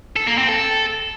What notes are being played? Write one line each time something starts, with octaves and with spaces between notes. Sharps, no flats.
A4
A#3
C4
A4